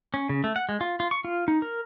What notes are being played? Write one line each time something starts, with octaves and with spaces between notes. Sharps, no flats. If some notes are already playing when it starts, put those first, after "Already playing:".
C#4
C#3
A3
F#5
G#3
F4
F4
C#6
F4
D#4
A#4